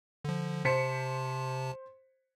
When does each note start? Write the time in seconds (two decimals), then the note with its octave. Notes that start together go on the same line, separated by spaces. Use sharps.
0.25 D3 F3
0.65 C3 C5 A5 B6 C#7